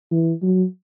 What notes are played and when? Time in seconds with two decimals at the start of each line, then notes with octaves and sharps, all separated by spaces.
0.11 E3
0.42 F#3